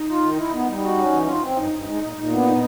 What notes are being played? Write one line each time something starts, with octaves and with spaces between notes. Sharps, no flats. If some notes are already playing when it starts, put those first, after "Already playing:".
Already playing: D#4
F4
D#3
E4
B3
G3
F#4
C#4
E3
F4
C4
G2 D#4
G2
G#3
A#2
A#2
B3
D4
D#4